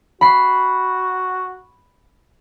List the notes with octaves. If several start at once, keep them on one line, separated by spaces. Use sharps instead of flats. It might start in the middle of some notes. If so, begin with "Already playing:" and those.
F#4 B5 C7